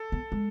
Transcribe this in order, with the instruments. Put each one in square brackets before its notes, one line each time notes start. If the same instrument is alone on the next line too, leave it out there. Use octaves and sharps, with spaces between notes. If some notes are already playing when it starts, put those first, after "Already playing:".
Already playing: [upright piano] A4
[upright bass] B3
G#3